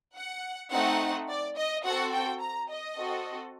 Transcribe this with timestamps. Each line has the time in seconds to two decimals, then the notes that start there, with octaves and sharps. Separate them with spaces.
0.16 F#5
0.71 A3 C4 D#4 F#5
1.29 D5
1.57 D#5
1.84 C4 F#4 A4 F#5
2.13 G5
2.41 A#5
2.70 D#5
2.98 C4 F#4 A4